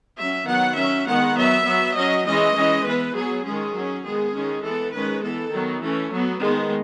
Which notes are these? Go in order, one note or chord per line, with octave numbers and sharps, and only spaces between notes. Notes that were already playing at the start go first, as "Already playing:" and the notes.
F#3 C#4 E5
D#3 F#3 B3 F#5
F#3 C#4 E5
D#3 G#3 B3 F#5
F#3 B3 E5
F#3 B3
F#3 C#4 D#5
E3 G#3 C#4 D#5
E3 G#3 C#4
E3 B3 B4
F#3 B3 G#4
D#3 G#3 C#4 G#4
F#3 C#4
D#3 G#3 B3 G#4
D#3 G#3 C#4
E3 B3 A4
D#3 G#3 C#4 B4
E3 B3 A4
D#3 F#3 B3
E3 A3 C#4
F#3 B3
D#3 G#3 B3